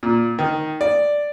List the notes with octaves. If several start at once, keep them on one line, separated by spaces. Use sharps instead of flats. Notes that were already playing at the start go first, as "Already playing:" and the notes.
A#2
D#3
D5